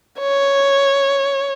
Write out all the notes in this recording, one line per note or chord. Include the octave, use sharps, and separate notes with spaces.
C#5